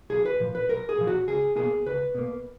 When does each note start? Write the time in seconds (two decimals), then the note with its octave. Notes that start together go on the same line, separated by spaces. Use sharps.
0.10 B1 G#4
0.26 B4
0.40 A#2 F3
0.55 B4
0.69 B1 A#4
0.89 G#4
0.98 A#2 F3
1.07 F#4
1.28 C#2 G#4
1.56 B2 A#3 G#4
1.86 C#2 B4
2.14 B2 A#3